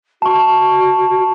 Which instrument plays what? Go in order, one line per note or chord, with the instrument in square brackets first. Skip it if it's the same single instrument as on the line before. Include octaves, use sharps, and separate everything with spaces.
[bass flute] F#4 [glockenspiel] A5 C#6